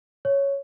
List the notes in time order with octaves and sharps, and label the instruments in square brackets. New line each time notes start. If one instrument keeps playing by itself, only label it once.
[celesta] C#5